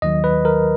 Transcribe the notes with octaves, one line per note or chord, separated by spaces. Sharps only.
D#2 D#3 F#3 D#5
B4
A#4